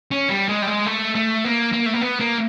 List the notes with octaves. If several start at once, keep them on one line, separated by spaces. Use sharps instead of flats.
C#4
G3
G#3
G3
G#3
A3
A3
A#3
A#3
A3
A#3
B3
A#3